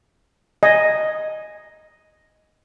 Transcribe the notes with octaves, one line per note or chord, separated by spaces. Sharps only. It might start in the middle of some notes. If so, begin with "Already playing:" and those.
D#5 G#5